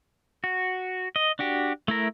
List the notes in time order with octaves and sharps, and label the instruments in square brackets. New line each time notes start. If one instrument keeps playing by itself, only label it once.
[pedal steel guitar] F#4
D#5
D4 F#4 G4
A3 E4 A#4